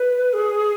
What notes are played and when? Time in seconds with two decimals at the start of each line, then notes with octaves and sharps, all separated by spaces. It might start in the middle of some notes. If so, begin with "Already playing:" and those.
Already playing: B4
0.33 G#4